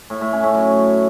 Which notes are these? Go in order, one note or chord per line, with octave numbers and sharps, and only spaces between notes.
A2
A2
C#4
A2
F#3